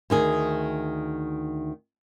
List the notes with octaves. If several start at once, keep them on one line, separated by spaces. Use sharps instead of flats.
D2 D#3 G#4